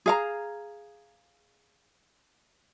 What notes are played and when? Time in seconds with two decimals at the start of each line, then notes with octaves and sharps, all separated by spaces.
0.06 G#4 F5 A#5